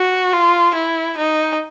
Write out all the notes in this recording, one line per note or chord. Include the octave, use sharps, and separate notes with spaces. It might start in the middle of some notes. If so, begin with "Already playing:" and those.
Already playing: F#4
F4
E4
D#4